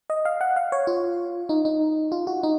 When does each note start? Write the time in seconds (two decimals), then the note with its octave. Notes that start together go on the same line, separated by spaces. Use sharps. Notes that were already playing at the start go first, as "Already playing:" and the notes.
0.10 D#5
0.25 F5
0.41 F#5
0.56 F5
0.72 C#5
0.87 F4
1.49 D#4
1.65 D#4
2.12 F4
2.27 F#4
2.43 D#4